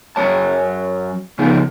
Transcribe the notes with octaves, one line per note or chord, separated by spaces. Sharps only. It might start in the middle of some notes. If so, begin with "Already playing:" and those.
F#2 F#3 A3 C#5 A5
C#3 F3 A3 B3 D#4